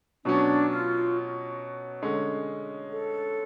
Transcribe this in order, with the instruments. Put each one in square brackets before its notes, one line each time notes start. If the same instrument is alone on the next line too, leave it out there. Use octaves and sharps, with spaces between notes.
[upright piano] B2 F#3 C#4 [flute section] D4
[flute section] F4
[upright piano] D3 G#3 C#4
[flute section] A4